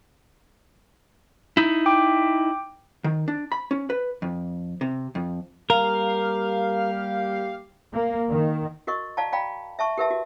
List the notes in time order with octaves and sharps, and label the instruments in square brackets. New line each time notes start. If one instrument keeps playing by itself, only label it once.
[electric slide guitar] D#4 E4
[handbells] G5 D6
[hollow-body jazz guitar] D#3
D4
B5
C#4
B4
F2
C3
F2
[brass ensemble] G3 A#3 G4 [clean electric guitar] A#4 [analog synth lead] F5
[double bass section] A#3
D#3
[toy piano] F#4 A#4 D#5 C#6
D5 F5 A5 A#5
D5 F5 G5 A#5 B5
E5 A5 C#6
G4 A#4 B4 E5 A5
F#4